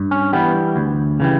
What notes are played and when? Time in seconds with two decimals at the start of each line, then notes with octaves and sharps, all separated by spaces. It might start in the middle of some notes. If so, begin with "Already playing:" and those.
Already playing: G2
0.11 C#4
0.33 E3 G3 B3
0.76 D2
1.20 C#3 E3 G3